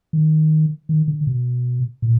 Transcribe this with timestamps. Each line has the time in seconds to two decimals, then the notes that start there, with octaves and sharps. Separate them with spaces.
0.13 D#3
0.89 D#3
1.08 D3
1.27 B2
2.02 A#2